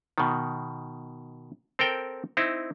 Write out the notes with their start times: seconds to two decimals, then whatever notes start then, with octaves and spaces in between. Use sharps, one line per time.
0.18 B2 D#3
1.79 C4 A4 A#4 G5
2.37 C4 D#4 E4